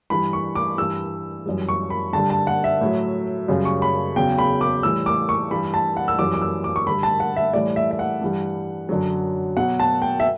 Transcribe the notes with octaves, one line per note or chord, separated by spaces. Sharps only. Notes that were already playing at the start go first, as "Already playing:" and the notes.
G2 E3 G3 B5
C#6
D6
G2 E3 G3 E6
F#2 E3 G3
C#6
B5
G2 D3 G3 A5
A5
F#5
E5
A2 F#3
F#2 C#3 G3
C#6
B5
E2 C#3 F#3 G5
B5
D6
A2 E3 G3 E6
D6
C#6
G2 E3 G3 B5
A5
F#5
E6
F#2 E3 G3 D6
D6
E6
D6
C#6
G2 D3 G3 B5
A5
F#5
E5
A2 E3 G3 D5
E5
E5
F#5
G2 E3 G3
F#2 D3 F#3
B2 F#3 F#5
A5
G5
E5